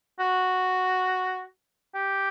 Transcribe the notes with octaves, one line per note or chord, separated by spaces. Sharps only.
F#4
G4